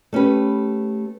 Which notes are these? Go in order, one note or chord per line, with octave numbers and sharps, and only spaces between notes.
A3 C#4 G4 B4